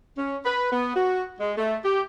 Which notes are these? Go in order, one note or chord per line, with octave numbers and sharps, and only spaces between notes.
C#4
B4
B3
F#4
G#3
A3
G4